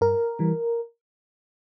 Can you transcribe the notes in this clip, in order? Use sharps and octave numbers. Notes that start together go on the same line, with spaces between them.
G2 A#4
E3 G3